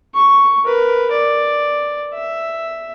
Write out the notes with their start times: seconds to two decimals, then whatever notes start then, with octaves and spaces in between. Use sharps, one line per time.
0.15 C#6
0.64 A#4 B4
1.11 D5
2.14 E5